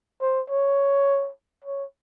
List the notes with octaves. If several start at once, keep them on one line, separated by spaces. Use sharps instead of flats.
C5
C#5
C#5